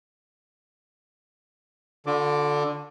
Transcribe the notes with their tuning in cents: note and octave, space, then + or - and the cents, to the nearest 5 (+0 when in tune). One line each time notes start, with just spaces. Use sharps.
D3 +0 F4 +45 D6 +0